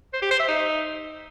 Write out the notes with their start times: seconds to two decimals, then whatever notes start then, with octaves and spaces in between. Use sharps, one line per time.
0.13 C5
0.22 G4
0.31 C5
0.39 E5
0.48 D#4